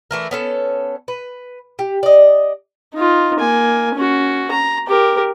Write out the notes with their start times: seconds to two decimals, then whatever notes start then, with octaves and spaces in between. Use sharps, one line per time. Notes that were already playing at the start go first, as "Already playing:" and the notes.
0.11 E3 A3 A#4
0.31 B3 C#4 A4
1.08 B4
1.79 G4
2.03 D5 D#5
2.95 D#4 F4
3.39 A#3 G#5
3.95 C#4 F#4
4.51 A#5
4.87 G4 A#4